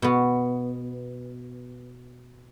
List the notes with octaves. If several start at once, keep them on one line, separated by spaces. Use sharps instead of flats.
B2 B3